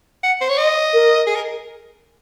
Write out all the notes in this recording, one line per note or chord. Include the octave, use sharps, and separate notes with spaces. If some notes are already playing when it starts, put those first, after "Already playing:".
F#5
C5
C#5
D#5
A#4
G#4
A#4